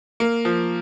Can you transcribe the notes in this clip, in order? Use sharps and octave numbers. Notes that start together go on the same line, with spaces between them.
A#3
F3